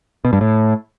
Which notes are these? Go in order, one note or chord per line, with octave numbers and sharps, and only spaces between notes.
B2
G2
A2